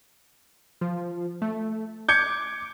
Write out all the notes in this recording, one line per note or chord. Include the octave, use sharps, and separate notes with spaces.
F3
A3
D6 G6 G#6 C#7